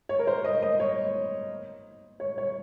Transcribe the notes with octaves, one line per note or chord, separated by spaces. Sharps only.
C#5
A#4
C5
D#5
D#5
C#5
C#5
C#5